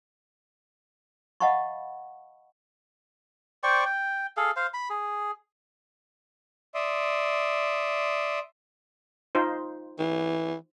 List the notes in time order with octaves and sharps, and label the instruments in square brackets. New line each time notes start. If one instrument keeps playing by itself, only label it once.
[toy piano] D#5 F5 F#5 A5 B5 C#6
[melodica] C5 D5 G5 C#6
G5
G#4 A4 F5
C5 F5
B5
G#4
[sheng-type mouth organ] D5 E5 C6 D#6
[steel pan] D#4 F4 C5
[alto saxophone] E3